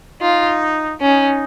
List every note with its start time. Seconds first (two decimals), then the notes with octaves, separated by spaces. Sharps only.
0.21 D#4 F4
1.01 C#4 D#4